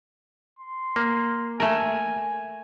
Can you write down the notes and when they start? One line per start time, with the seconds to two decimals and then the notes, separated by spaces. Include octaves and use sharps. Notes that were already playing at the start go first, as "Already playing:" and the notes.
0.59 C6
0.96 A#3
1.60 A3 A#4 G#5